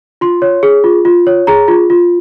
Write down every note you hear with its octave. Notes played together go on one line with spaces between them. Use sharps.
F4 C6
C#5
G#4
F4
F4
C#5
G#4 A#5
F4
F4